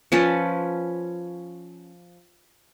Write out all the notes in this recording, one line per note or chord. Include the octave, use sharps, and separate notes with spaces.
F3 C#4 B4 A5